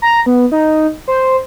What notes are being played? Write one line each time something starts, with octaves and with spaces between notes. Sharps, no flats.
A#5
B3
D#4
C5